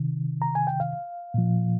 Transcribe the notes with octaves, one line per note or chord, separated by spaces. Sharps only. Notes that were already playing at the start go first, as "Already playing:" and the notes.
Already playing: C3 D#3
A#5
G#5
G5
F5
A#2 F3